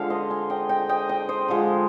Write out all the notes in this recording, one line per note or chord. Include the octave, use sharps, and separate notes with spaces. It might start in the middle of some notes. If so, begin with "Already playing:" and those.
Already playing: D3 F3 G#3 F5
C5 D#5
F5 G#5
D#5 G5
D#5 G5
D#5 G5
D#5 G5
C5 D#5
D3 F3 G#3